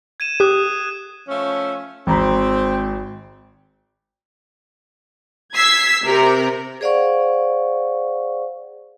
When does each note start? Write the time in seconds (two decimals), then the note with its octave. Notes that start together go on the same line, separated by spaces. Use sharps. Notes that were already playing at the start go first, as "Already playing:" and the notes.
0.20 G#6 D#7 E7
0.40 G4 D#6 F#6
1.28 F3 A3 C#4
2.07 G#1 C4 A#5 B5
5.55 E6 G#6 B6 C7
6.04 C3 A#4
6.81 G#4 C5 D5 F5 F#5 C#6